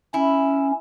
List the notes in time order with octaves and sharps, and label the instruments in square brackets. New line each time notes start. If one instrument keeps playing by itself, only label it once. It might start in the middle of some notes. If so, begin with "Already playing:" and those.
[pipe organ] C#4 [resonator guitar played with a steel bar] E4